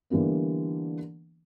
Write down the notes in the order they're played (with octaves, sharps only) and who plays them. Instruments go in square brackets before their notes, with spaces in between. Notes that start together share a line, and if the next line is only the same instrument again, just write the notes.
[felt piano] D3 E3 G3 A#3 B3